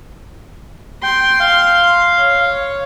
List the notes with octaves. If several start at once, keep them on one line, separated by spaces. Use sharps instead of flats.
G5 C6
F5
C#5